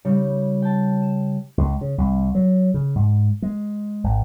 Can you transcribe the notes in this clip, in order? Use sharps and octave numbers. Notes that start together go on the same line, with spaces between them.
C#3 G3 D#4
G5 A5
E7
C#2
C#3
C2
F#3
C#3
G#2
G#3
G#1